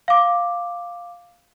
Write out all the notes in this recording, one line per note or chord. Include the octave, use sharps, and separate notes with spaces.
F5 D6